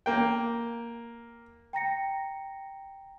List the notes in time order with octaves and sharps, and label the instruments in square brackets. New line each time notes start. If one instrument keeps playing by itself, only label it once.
[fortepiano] A#3 G5
[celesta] G5 A#5 A#6 C#7